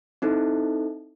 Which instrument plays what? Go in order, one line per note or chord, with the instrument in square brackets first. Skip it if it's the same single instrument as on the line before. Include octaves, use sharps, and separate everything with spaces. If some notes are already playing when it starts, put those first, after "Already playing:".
[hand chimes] C4 D#4 E4 A4